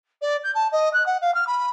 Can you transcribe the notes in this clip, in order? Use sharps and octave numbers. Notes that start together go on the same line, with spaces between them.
D5
G6
A5
D#5
F#6
F#5
F5
F6
B5